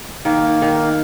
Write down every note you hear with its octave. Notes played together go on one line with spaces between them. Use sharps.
D#3 A#3
D#3